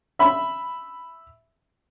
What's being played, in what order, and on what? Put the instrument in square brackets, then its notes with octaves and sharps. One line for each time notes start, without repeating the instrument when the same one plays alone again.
[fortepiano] E5 B5